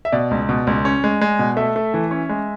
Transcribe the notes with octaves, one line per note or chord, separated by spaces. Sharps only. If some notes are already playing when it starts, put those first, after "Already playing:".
E5
B2 D5
C#2
B2
C#2
C#4
G#3
G#3
B2
A3 E5
A3
E3
C#4
G#3